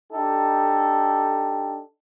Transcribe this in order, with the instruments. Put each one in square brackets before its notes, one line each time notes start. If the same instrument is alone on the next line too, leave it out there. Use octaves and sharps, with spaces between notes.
[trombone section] D4 D#4 G4 A4